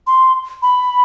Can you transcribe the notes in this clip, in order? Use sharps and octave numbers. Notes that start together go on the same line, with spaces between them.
C6
B5